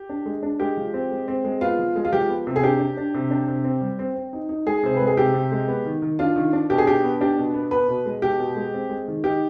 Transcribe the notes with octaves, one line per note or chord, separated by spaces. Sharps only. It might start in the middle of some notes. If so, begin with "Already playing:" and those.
Already playing: G4
D4
G#3
D4
G#3 G4
F3
C4
G#3
C4
G#3
B3 F4
F3
G#3
F4
F3 G4
B3
C3
G#4
D4 G4
D4
D4
C3
D4
C3
C4
G3
C4
C4
D#4
D#4
G#3 G#4
C3 C5
G#3 B4
G#4
C3 G4
C3
G#3
B3
D#3
D#3
D4 F4
D#3
D4
B2 G4
G#4
D4 G4
B3
D4 G4
B2
B3
B3 B4
B2
G#3
B2 G4
B2
G#3
C4
G#3
D#3
D#4 G4